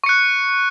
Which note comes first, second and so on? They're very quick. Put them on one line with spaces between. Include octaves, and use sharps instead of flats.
C#6 C#7 F#6